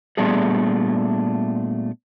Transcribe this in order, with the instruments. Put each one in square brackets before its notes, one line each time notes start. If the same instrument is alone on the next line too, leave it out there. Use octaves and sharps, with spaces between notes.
[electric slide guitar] A#2 G3 A3 B3 D4 G#4